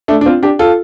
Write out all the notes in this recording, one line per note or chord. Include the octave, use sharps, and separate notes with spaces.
A3 D4
D4
C4 F4
D4 G4
F4 A4